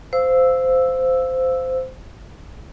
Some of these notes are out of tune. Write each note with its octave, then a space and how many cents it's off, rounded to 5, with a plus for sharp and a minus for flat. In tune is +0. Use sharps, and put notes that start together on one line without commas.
C5 -15 F5 +0 E6 +0